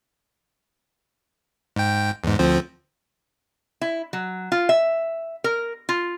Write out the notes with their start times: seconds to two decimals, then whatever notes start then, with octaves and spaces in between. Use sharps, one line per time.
1.76 G#2 G5
2.24 E2 G#2
2.39 D2 F3 C4
3.81 E4
4.13 F#3
4.52 F4
4.69 E5
5.44 A#4
5.89 F4